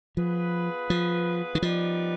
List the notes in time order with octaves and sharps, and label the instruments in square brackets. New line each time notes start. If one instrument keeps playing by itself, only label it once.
[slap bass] F3 [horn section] B3 F4 G#4 B4
[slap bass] F3
D#3
[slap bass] F3 [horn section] G3 B3 D#4 B4 D5